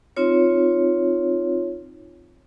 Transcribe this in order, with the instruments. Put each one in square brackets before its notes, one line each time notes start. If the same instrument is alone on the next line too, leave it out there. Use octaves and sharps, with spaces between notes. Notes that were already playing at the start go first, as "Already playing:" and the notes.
[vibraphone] C4 D#4 F4 C#5